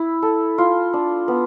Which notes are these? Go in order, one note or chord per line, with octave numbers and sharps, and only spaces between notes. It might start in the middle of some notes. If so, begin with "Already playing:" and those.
Already playing: E4
A4
F4
D4
B3